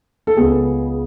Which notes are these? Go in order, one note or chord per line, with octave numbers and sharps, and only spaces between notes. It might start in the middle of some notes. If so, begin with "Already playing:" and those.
A4
C#2 C#3 G#3 B3 G#4